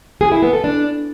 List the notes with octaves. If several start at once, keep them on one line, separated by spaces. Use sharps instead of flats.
G#4
E4
B3
A4
D4